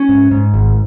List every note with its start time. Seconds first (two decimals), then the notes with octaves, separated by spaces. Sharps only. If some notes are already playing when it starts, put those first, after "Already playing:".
Already playing: C#4
0.09 G#2
0.31 G#2
0.54 G#1